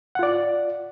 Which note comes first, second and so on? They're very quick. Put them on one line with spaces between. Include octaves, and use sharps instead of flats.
F#5 F4 D5